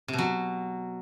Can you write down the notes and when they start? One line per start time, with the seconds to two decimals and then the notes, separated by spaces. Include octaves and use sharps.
0.08 C3
0.13 B2
0.18 F#3